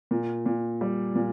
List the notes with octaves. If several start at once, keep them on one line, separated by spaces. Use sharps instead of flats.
A#2
A#2
G3
A#2